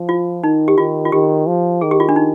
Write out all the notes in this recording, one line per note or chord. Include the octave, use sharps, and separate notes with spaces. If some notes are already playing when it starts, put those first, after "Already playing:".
Already playing: F3
F4
D#3 D#4
G4
D#3 F4
F4
D#3 G4
F3
D#3 G#4
G4
F4
D4
D#4